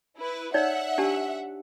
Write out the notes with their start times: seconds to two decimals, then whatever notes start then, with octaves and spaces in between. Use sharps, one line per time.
0.18 E4 B4
0.54 D#4 C#5 D5 E5 F#5
0.98 D4 G4 A5